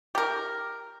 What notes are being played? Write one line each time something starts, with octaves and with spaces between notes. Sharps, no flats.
G4 A#4